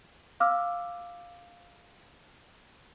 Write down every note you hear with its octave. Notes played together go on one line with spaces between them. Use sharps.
F5 D6 E6 F6